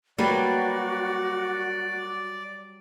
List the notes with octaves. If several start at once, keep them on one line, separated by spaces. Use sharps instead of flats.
F#3 G3 A#3 F#4 G4 B4 D5